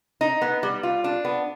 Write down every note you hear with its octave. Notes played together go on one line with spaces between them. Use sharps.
D#4
B3
G3
F4
D4
B3